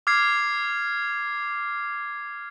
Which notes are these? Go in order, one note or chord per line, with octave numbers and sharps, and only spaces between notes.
D6 F6 G#6 C7